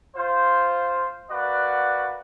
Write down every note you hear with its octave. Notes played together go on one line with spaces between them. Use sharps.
F4 C5
A#3 F#4 B4 D5 F#5